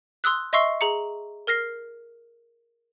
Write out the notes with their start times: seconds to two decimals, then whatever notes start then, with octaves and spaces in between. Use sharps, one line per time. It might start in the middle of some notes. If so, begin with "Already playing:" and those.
0.24 C6 D#6 E6 F#6
0.53 D#5 E5 C6 C#6 E6 C7
0.81 G#4 A#5 C#7
1.47 A#4 F6 A#6 C7